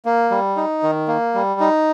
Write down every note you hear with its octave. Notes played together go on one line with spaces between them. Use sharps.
A#3
G3
D#4
D#3
A#3
G3
D#4